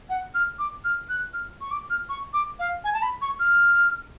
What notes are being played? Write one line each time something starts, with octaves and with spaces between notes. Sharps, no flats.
F#5
F6
D6
F6
F#6
F6
C#6
D6
F6
C#6
D6
F5
G#5
A5
B5
C#6
F6